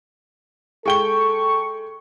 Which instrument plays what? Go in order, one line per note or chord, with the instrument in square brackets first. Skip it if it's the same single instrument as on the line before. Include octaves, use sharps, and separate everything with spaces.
[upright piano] G#3 G5 G7 [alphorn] A4 [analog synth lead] C#6